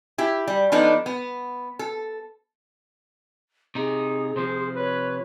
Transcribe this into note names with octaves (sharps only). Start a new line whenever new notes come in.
E4 G4
G3
F3 B3 D4 D#4 A4
B3
A4
C3 D#4 G#4
C3 F3 C5
B4 C#5